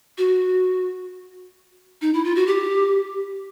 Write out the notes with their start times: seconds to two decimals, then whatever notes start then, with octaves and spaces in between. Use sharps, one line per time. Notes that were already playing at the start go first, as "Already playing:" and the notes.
0.18 F#4
2.02 D#4
2.14 E4
2.24 F4
2.35 F#4
2.47 G4